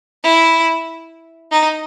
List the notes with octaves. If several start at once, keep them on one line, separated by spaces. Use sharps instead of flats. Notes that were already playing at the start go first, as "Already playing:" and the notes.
E4
D#4